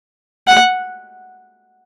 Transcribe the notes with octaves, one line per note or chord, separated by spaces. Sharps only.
F#5